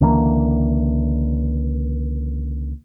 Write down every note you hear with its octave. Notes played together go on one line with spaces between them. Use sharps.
C#2 D3 E3 A#3